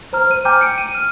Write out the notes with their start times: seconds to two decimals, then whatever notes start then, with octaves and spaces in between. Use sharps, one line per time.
0.13 C5 A#5 F6
0.30 C5 D#7
0.45 G5 G#5 A#5 D6 F6 G6
0.61 C#7 D7
0.78 D#7
0.94 F6